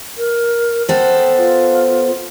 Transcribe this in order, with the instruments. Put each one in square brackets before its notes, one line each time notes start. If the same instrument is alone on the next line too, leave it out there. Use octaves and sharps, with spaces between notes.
[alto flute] A#4
[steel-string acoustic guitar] B3 A4 C5 [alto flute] G5
[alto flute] F4